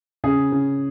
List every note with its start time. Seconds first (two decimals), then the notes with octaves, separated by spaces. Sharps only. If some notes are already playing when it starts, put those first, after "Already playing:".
0.24 C#3 G#4
0.52 C#3